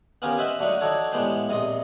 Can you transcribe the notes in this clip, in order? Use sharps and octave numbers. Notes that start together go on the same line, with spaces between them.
B3 C#4 F4 G4 G#4 A#4
C5 D#5 E5 F#5 C6
D3 F#3 A3 D4 D#4
D4 D#4 F#4 A4 C#5 D5
A2 G#3 B3 G4 G5 C6
A#1 C3 D#5 C6 D#6